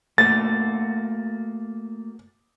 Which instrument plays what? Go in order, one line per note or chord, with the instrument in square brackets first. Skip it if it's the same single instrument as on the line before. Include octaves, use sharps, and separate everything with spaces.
[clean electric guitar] A3 A#3 F#4 [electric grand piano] A6